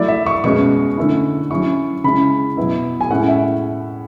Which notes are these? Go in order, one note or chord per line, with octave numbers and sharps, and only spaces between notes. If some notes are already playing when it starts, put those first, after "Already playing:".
Already playing: F#3 A3 E4 D5
E5
C#6
B2 G#3 C#4 C#6
D3 A3 C#4 E4
F#3 C#4 E4 C#6
C#3 G#3 C#4 E4 B5
B2 F#3 B3 E4
G#5
A2 G#3 C#4 E4 F#5
E5